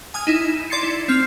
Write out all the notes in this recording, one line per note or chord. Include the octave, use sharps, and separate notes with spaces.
G#5 D#6 F6 G#6
D#4 E4
D5 C6 G#6 A6 C7 C#7
E4
C4 F6 C7